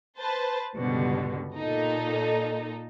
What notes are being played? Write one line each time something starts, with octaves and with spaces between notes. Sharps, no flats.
B4 C5 A5
C#2 G2 B2 D3 G3
A#2 D#4 A4